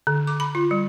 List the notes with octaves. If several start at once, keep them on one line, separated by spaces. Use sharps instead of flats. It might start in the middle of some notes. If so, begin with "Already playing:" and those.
D3
D6
B5
F4
G3